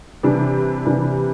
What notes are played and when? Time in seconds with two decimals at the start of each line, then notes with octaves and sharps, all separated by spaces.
0.23 C3 E3 G3 D4
0.85 C3 E3 G3 D4